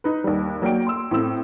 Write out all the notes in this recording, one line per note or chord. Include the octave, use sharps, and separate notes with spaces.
D#4 B4
D#2 G3
F#3 A#3 D5 G5 D7
C6 E6
A2 C4 E6